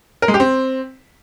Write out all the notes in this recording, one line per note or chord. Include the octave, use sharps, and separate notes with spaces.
A#4
G#3
G4
C4